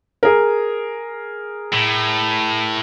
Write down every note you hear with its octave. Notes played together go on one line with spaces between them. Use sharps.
G#4 A#4
A2